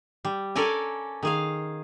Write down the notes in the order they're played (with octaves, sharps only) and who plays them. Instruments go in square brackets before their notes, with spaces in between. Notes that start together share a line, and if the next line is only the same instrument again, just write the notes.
[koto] G3
C#4 A4 A#4 D5 G#5
D#3 G#4 F5